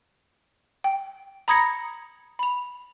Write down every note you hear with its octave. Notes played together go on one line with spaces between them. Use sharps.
G5
A#5 B5 D#6 G#6 A#6 C#7
B5 F7